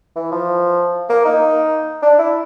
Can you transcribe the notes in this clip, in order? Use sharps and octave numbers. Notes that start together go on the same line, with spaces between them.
E3
F3
A#3
D#4
D4
E4